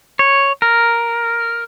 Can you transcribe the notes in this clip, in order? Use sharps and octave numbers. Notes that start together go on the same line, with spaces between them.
C#5
A#4